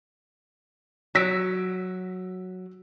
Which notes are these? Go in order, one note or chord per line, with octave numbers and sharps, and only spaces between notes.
F#3 E6 B6 D7